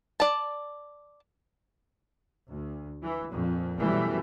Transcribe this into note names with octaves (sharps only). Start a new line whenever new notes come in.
D5 A5
D2
E3
F2 A#2
F#2 B2 E3 G3 A3